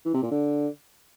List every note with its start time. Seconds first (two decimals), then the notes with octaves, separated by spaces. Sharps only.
0.05 E3
0.14 C3
0.23 A#2
0.31 D3